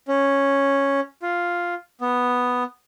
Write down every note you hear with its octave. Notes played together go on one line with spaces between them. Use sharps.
C#4
F4
B3